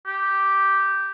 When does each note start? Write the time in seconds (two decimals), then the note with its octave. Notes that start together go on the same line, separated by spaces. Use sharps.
0.07 G4